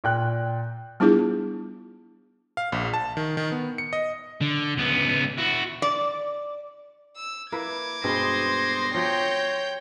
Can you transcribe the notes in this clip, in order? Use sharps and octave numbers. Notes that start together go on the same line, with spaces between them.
A#2 G5 F#6
G3 B3 D4 E4 F4 G#4
F5
A#1
A5
D#3
D#3
B3
C#7
D#5
D3
C#2 B3
E4 F#4
D5
E6
A#3 E4 B4 D6 G#6
G2 B2 G#3 C5 C6 D#6 A#6
F3 F#4 C#5 D5 G5 G6